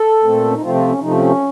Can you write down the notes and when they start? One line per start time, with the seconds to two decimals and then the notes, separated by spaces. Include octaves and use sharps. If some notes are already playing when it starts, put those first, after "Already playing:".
Already playing: A4
0.23 A#2 A3 C4
0.46 C#4
0.54 D#4
0.62 C3 F3 A3 C4 F4
0.75 F4
0.88 C#4
1.00 C3 F3 A3 C4 D#4
1.11 C#4